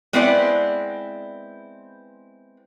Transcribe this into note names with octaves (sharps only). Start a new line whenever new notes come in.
G#3 B3 C4 E4 B4 D5